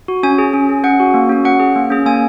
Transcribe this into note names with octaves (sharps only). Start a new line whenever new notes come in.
F#4
C#4 G#5
G#4
C#4
G#4
C#4 F#5
F#4
A#3
C#4 F#4
C#4 F#5
G#4
A#3
C#4 G#4
A#3 G#5